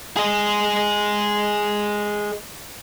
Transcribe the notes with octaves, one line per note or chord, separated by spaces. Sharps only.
G#4 D#5